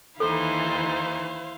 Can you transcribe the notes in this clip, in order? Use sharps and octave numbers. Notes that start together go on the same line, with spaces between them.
D#2 E3 D#4 E4 A4 C5 F5